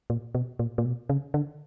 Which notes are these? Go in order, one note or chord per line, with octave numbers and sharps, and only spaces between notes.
A#2
B2
A#2
A#2
B2
C#3
D3